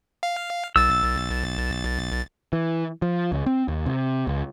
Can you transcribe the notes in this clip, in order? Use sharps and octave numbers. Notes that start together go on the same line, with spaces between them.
F5
B1 E6 A6
E3
F3
C#2
C4
D#2
C3
C#2